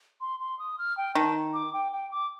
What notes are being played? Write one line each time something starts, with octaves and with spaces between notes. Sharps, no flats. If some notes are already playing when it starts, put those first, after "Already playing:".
C6
C6
D#6
F6
G5
D#3 A5
D6
G5
G5
D6